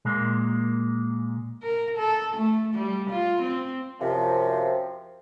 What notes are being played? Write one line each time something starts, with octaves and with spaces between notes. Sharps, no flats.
A#2 G#3 A#3
A#4
A4
A3
G3
F4
C4
F#2 C3 F3